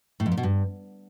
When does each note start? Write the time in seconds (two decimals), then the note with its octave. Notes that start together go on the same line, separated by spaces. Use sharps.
0.20 A2
0.26 F2
0.32 A#2
0.37 B2
0.43 G2